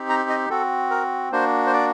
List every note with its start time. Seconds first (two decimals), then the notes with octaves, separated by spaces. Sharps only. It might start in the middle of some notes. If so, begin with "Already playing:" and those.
Already playing: C4 D#4 G4
0.09 A#5
0.29 D#5
0.50 C4 F#4 A4
0.91 A#4
1.32 A#3 D4 F#4 C5
1.66 C5
1.73 D5